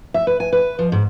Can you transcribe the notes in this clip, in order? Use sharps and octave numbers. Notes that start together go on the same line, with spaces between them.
E5
B4
G#5
B4
F3
G#2